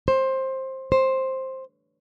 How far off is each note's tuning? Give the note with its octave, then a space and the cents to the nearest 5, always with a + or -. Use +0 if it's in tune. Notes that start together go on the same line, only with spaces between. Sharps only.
C5 +15
C5 +10